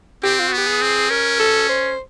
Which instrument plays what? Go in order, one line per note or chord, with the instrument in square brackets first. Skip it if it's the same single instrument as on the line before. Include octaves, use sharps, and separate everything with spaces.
[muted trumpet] C4 [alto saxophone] G4
[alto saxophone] F4
[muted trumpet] B3 [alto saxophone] F#4
[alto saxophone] G4
G#4
[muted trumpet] C4
[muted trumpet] C#4 [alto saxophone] A#4
[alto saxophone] A4
C5